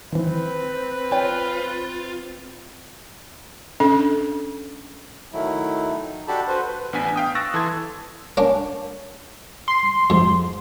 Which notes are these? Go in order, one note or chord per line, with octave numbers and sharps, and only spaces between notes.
D#3 E3 C4 B4
F4 C#5 G5
C#4 D4 A4
D#3 F#3 A3 E4
D#4
D4 F#4 G4 A4 A5 B5
F#4 B4 C5
B4
A1 B3 D4 G#5 B6
F5 G5 D#6
C#6 E6 F#6 A6 A#6
E3 A4 A5 C6 G#6
A#3 C#4 D4
C6
F2 G#2